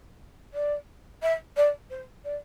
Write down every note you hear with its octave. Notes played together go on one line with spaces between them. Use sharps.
D5
E5
D5
C5
D5